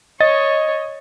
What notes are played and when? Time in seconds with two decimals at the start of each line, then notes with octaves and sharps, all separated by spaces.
0.20 C#5 D#5 A6